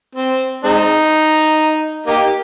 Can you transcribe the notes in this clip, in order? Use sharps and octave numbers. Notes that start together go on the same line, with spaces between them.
C4
G#3 C4 D#4
A#3 D#4 G4